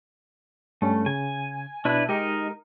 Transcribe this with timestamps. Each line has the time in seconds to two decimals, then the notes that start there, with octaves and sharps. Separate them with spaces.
0.82 G2 G3 A3 C#4
1.06 C#3 G#5
1.85 B2 D4 E4 B4
2.09 G#3 D#4 G4 A#4 D#5